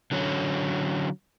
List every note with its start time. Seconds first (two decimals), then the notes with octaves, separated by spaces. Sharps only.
0.12 D3 F#3 C#4